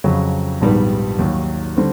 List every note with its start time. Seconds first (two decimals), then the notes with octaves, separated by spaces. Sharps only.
0.04 F2 C#3 F#3
0.61 A#1 G#2 D#3 G3 B3
1.19 D#2 D#3 F#3
1.77 D3 G3 C4